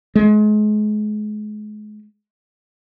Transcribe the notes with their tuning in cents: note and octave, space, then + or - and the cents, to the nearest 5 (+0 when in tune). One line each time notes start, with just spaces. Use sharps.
G#3 +35